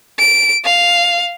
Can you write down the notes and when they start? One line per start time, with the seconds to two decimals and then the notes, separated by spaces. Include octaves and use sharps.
0.19 D7
0.65 F5